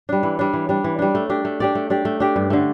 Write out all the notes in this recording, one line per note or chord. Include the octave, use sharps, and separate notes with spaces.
G3 D4
E3
G3 D4
E3
G3 D4
E3
G3 D4
A3
D4 G4 D5
A3
D4 G4 D5
A3
D4 G4 D5
A3
D4 G4 D5
G2
D3 A3